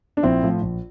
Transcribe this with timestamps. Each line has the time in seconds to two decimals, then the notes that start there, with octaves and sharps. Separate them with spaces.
0.17 D4
0.23 A#1 C4 E4
0.42 A2 F3
0.61 A#1